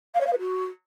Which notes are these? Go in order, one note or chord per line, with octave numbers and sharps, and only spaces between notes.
F5
C#5
F5
B4
F#4